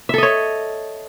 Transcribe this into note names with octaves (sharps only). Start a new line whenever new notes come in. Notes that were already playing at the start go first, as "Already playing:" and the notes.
A4 C#5 D#5 E5